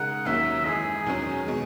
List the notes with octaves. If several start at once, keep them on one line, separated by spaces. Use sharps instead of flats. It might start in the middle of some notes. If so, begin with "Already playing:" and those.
Already playing: C#3 G#3 D#4 A#4 F#5
D#2 D#3 F#3 A#3 C#4 E5
F#2 E3 G#3 D#4 G#4
E2 D#3 F#3 C#4
B2 G#3